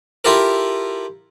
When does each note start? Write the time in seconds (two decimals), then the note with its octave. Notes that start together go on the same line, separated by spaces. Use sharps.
0.25 E4 F4 G4 A4 A#4